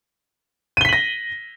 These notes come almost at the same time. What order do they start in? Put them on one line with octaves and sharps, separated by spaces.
D#7 G7 B6 F#7 A#6